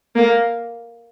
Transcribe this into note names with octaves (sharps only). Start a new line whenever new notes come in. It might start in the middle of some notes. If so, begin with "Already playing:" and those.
A#3